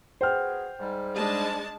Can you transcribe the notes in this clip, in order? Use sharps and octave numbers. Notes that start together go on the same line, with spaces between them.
B3 F#4 G#4 C5 G5 F6
G#2 G3
G#3 D4 A5